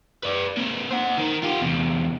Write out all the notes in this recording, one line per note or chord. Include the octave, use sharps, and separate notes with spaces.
B4 D5
A#3 C4
C5 F#5
D#3 D#4
F4 G4
E2 C3